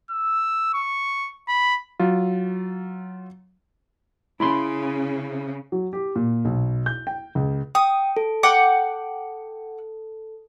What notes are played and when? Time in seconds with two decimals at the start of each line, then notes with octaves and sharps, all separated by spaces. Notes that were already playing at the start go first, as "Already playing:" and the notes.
0.10 E6
0.74 C#6
1.48 B5
1.99 F#3 F4
4.40 C#3 E4 B5 C6
5.72 F#3
5.93 G4
6.15 A#2
6.45 B1
6.86 G6
7.07 G5
7.35 C#2
7.75 G5 D#6
8.17 A4
8.43 F#5 G5 D6